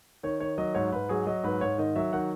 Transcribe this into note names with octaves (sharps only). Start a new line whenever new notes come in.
D#3 C#5
D#3 C#5
F#3 D#5
G#2 C#5
G#2 B4
F#3 G#4
F#3 D#5
G#2 B4
G#2 C#5
D#3 D#5
F#3 E5
D#3 F#5